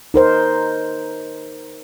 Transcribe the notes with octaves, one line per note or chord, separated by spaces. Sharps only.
D#4 A#4 C5